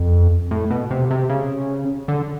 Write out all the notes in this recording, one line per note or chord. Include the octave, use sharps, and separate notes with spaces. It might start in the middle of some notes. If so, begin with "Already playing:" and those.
Already playing: F2
A2
B2
C3
C3
C#3
D3